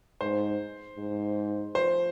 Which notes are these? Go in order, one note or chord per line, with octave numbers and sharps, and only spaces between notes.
G#2 C5
G#2
F3 C5